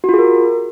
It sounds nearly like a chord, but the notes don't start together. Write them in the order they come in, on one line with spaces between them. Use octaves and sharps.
F#4 F4 G#4 A#4